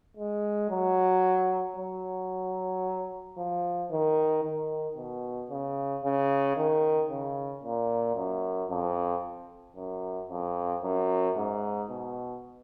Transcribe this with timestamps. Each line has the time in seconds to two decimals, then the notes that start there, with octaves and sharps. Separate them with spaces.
0.17 G#3
0.70 F#3
1.77 F#3
3.38 F3
3.91 D#3
4.44 D#3
4.97 B2
5.50 C#3
6.04 C#3
6.57 D#3
7.10 C#3
7.64 A#2
8.17 F#2
8.70 F2
9.77 F#2
10.30 F2
10.83 F#2
11.37 G#2
11.91 B2